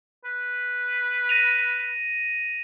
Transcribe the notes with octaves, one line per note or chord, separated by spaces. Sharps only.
B4
A#6 D#7 F7